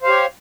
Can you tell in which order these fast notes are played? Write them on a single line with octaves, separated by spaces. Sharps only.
C5 F5 G4 C#5